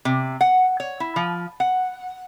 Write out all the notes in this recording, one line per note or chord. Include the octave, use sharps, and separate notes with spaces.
C3
F#5
C#5
E4
F3
F#5